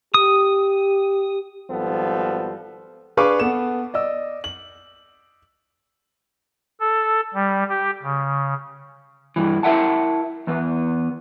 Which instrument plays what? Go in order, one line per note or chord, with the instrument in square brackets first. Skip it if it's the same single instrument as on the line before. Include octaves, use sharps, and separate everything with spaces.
[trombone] G4 [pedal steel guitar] D#6
[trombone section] G#1 F3 G3 B3 A4
[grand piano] D4 G#4 B4 F5 C#6 D6
B3 A4 E7
D5 D#5 E6
F#7
[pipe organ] A4
G3
G4
C#3
[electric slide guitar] G2 E3
E4 A#4 E5 F#5 A5
E2 B3